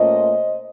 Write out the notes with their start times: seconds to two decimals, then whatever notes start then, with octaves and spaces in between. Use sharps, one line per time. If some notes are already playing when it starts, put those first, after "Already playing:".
Already playing: A#2 A3 C#4 C5 D#5